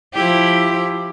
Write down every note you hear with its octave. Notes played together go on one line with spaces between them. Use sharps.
F3 E4 G4